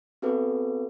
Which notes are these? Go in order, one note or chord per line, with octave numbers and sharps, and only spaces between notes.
B3 C4 F#4 G#4 A4 B4